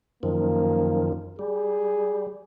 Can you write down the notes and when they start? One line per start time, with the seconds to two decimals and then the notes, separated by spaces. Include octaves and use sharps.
0.23 F#2 D#3 F3 A#3
1.39 G3 G#4